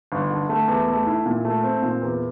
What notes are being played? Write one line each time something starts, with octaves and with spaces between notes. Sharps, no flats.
G1
D3
A3
E2
A3
E4
A#2
A3
C4
A#2
E2